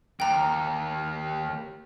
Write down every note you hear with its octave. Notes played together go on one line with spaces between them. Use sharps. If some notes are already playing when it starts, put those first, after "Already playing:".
D#2 G5 A#5